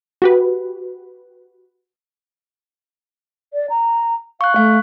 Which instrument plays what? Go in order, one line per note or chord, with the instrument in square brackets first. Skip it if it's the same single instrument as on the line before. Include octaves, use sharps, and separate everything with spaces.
[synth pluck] F#4 G4 B4
[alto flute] D5
A#5
[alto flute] F5 [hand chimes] C#6 F#6
[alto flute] A3 [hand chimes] F5